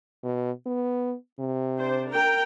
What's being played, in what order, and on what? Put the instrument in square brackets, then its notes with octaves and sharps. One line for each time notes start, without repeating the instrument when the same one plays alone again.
[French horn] B2
B3
C3
[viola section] D4 C5
A#4 G5